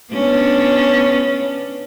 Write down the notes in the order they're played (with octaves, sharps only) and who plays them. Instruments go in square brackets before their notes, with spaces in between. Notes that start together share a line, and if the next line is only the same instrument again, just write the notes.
[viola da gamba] B3 C#4 D4